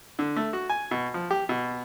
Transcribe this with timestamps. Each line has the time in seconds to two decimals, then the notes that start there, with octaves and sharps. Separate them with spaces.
0.19 D3
0.36 A3
0.53 F#4
0.70 G#5
0.91 B2
1.14 F3
1.31 G4
1.49 B2